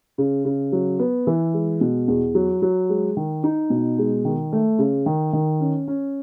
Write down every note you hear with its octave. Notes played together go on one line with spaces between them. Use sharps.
C#3
C#3
F#3
B3
E3
G#3
B2
E2
F#3
F#3
G#3
D#3
D#4
B2
G#3
D#3
A3
C#3
D#3
D#3
C#4
C#4